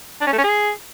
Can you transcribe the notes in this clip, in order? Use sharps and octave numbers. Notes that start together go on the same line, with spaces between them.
D4
C#4
A3
C#4
G#4